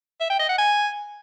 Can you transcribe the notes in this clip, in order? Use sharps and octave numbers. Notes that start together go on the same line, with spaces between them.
E5
G5
D#5
F#5
G#5